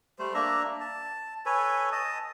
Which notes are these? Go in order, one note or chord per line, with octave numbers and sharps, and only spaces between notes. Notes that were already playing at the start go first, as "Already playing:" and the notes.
G3 A3 C5
A#3 D4 E5 A#5
A5
A4 B4 C#5 G#5
D#5 A5 D#6